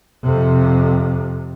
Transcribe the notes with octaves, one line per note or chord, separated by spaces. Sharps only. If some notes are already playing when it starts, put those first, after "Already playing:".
F2 C3